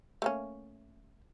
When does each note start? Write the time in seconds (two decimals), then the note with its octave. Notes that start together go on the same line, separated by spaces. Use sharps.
0.22 A3 A#3 C#4